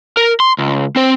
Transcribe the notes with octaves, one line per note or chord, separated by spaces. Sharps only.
A#4
C6
C#2
C4 C5